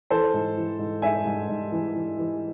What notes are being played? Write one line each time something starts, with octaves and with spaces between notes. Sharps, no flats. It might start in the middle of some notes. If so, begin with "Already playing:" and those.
E3 A4 C5
G#2
E3
G#2
G#2 E5 G#5
G#2
G#2
E3
E3
E3